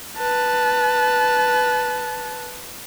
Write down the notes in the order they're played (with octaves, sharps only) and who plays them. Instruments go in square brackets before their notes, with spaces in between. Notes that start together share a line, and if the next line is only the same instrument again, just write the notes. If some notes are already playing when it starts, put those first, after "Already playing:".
[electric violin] B4 A5